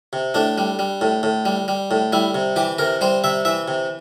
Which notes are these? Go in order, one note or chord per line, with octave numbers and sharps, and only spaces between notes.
C3
A2 D4
G3
G3
A2
A2
G3
G3
A2
G3 E4
C3
E3 G4
C3 A#4
G3 C5
C3 E5
E3 E5
C3